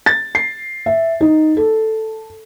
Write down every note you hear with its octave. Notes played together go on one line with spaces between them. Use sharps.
A6
C7
E5
D#4
A4